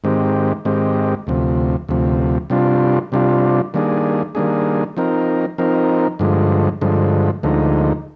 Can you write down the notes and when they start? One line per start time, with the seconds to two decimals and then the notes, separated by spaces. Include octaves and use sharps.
0.04 G#2 D#3 G#3 C4 G4
0.65 G#2 D#3 G#3 C4 G4
1.27 D2 C3 F3
1.89 D2 C3 F3
2.50 C3 G3 D4 F4
3.12 C3 G3 D4 F4
3.74 D#3 G3 A#3 D4 G#4
4.35 D#3 G3 A#3 D4 G#4
4.97 F3 C4 D#4 A#4
5.58 F3 C4 D#4 A#4
6.19 G2 D3 F3 G#3
6.81 G2 D3 F3 G#3
7.43 D2 D3 F3 G#3 D#4